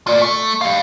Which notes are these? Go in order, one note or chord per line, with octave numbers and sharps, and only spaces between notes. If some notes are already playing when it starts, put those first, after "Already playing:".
F4 D5
A3
G4 F5